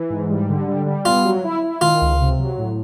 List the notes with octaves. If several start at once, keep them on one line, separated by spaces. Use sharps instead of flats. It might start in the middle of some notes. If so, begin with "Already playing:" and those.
Already playing: E3
G#2
G3
D3
G3
G3
B3 F4
F#3
E4
E4
D#3 F4
C#2
C3
F#3
A2